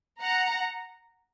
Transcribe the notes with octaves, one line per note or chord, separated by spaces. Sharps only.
F#5 A#5